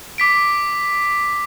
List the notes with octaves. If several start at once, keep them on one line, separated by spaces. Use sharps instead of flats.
D6 B6 D7